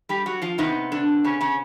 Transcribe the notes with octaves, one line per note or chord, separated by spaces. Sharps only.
G3 G4
F#3 F#4
F3 F4
C3 D#3 B3 D#4
D3 D4
C#3 C#4
C#3 C#4